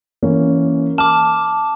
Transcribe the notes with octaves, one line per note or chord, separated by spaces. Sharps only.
E3 A#3 C#4
A5 D6 F6